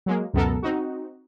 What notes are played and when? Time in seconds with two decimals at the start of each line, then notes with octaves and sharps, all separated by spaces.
0.06 F#3 G#3 A#3
0.34 C#2 F#2 B2 B3 A4 A#4
0.63 C4 D#4 F#4